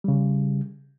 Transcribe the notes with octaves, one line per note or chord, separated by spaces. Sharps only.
C#3 G3